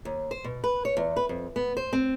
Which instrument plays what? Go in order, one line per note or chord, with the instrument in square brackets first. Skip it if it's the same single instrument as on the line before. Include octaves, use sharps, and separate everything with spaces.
[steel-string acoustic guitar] D#2
C5
B2
B4
C#5
E2
B4
F2
B3
C5
C4